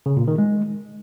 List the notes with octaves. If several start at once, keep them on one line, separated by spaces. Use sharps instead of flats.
C#3
A#2
D#3
G#3